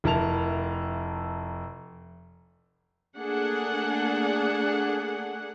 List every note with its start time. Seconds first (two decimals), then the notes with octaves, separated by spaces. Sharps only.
0.04 F1 E4 A#4 A5 F7
3.17 A3 A#3 D4 G#4 F#5